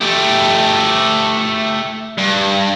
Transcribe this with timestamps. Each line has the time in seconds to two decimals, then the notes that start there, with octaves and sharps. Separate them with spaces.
0.01 A3 G4
2.18 G2